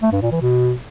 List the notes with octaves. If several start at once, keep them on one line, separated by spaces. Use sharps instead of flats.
A3
G2
A#2
E3
B2